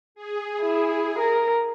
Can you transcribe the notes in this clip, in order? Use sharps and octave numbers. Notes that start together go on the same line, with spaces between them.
G#4
E4
A#4